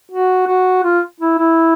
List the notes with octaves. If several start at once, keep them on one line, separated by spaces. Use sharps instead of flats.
F#4
F#4
F4
E4
E4